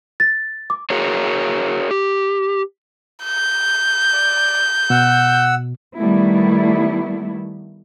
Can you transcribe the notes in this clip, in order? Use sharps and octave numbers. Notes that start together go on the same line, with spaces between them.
A6
D6
F#4 G#4 A#4 C#5
G4
G6
D5
B2 F#5 E6
D#3 G3 A3 B3 E4